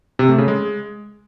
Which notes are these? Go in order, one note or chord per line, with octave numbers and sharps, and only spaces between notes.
C3
A3
C#3
G#3